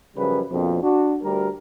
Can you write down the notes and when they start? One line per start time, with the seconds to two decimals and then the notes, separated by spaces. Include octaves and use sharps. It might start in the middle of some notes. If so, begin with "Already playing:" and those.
0.16 F#2 C#3 F3 G3 B4
0.51 A#1 F2 B2 F3
0.82 D4 F#4
1.23 D2 G3 A#4